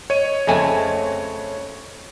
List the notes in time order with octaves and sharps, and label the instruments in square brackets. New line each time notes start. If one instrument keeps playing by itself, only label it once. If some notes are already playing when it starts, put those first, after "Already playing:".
[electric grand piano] C#5 D#7 [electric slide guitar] D#5
[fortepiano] F2 G#5 [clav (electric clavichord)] C#3 A3 C4 [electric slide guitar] D#5